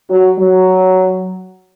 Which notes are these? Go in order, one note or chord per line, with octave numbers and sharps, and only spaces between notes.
F#3
F#3